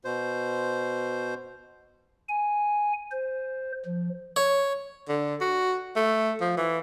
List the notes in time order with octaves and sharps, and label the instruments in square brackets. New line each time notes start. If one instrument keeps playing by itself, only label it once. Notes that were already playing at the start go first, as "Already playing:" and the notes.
[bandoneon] B2 C5
[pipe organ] G#5
C5
F3
[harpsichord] C#5
[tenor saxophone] D3
F#4
A3
F3
E3